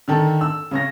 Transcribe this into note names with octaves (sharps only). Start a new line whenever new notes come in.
D3 D#3 A4
E6
C#3 C#5 A#6